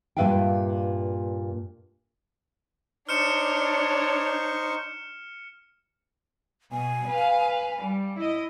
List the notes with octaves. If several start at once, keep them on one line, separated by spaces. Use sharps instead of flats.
G2 A#2 B4 E5 F5 G5
D4 D#4 C5 C#5 C#6 F6 C#7 E7
B2 G#5
B4 F5
G3
E4 D#5